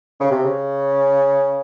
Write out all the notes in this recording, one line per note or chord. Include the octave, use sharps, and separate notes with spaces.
C#3
C3
C#3